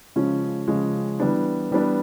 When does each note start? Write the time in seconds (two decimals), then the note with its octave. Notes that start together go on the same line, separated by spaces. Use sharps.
0.16 C#3 F3 G#3 C#4
0.68 C#3 F3 G#3 C#4
1.20 E3 G3 B3 D4
1.71 E3 G3 B3 D4